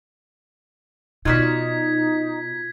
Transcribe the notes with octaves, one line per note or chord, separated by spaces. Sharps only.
B2 D#4 F4 F#4 D5 G#6 B6